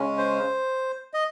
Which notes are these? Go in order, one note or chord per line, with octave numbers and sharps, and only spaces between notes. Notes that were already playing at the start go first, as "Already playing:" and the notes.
Already playing: C#3 G#3 C#4
C5
D#5